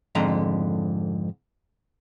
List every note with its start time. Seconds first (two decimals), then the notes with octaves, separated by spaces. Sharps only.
0.15 F2 G#2 D3 A#5